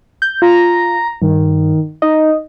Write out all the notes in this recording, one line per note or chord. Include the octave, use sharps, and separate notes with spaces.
G6
F4 A#5
G2 D#3
D#4 D#5